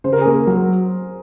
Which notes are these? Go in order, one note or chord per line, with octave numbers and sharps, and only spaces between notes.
C#3 C5
A#4
G#4
A#3 A#4
F#3